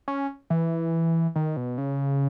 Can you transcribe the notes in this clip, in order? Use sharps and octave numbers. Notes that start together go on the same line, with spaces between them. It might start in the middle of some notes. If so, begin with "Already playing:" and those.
C#4
E3
D#3
B2
C#3